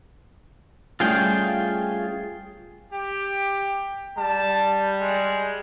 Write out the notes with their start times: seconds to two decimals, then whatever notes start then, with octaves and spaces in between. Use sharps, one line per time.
1.00 G2 A3 C#4 F4 G#4 G5
2.92 G4
4.17 G3 A5
5.00 G#3